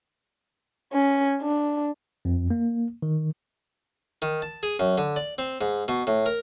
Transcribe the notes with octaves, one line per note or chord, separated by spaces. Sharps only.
C#4
D4
F2
A#3
D#3
D#3
A5
G#4
F#2
D3
D5
C4
G#2
B2
A2
A#4